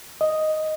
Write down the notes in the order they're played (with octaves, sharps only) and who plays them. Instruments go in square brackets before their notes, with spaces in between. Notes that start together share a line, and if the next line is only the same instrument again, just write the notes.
[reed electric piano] D#5